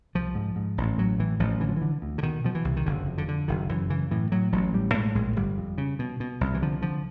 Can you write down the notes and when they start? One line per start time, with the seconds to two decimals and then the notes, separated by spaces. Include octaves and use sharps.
0.15 C2 F3
0.35 G#2
0.56 G#2
0.78 A1
0.98 A2 F#3
1.19 A2 E3
1.40 A1 F3
1.60 D3 E3
1.69 F3
1.77 E3
1.82 D3
2.02 D2
2.18 D3
2.23 B2 D#3
2.44 B2 F3
2.55 E3
2.65 C2
2.77 D#3
2.86 F#1 D3
3.06 F2
3.18 D3
3.28 D3
3.48 F#1 D#3
3.69 F#2 E3
3.90 C#3 E3
4.11 A2 E3
4.32 A2 F#3
4.52 A1 F#3
4.74 A2 G3
4.94 A2 G#3
5.15 A#1 G#3
5.36 G1 G3
5.58 F2
5.78 C#3
5.99 B2
6.20 B2
6.41 C2
6.54 E3
6.62 D3 F3
6.82 D3 F3